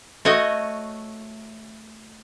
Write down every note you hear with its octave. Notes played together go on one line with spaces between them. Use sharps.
A3 F#4 C#5 D#5